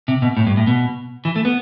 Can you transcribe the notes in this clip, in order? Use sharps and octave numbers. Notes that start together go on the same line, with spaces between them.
C3
B2
A2
G2
A2
B2
E3
A3
B3